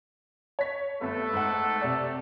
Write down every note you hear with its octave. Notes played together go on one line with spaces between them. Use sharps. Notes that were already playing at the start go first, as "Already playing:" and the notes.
C#5 B6
G1 A3 B3 A4
G#2 F#5
C3 D5